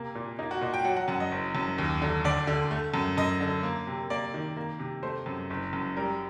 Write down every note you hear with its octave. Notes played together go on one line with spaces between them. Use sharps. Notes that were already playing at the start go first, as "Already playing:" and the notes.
Already playing: C3 A#3
A#2
A#3 D#4
F#4
A#2 D#5
G5
F#3 F#5
F#5
F#2 F#5
D#5
F#1
F#2
D#2
D3
D2 D5
D3
A3
F#2
F#2 D#5
D3
A#3
C3
A#3 D5
D#3
A#3
C3
A3 C5
F#2
F#1
F#2
G3 A#4